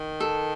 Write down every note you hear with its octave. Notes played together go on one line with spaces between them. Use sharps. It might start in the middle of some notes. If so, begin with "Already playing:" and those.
Already playing: D#3
A4